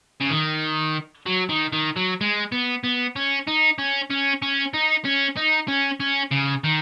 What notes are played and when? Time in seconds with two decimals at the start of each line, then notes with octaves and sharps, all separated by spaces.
0.21 C#3
0.31 D#3
1.26 F#3
1.49 D#3
1.73 D#3
1.96 F#3
2.21 G#3
2.52 B3
2.84 B3
3.16 C#4
3.47 D#4
3.79 C#4
4.10 C#4
4.42 C#4
4.74 D#4
5.05 C#4
5.37 D#4
5.68 C#4
6.00 C#4
6.31 C#3
6.64 D#3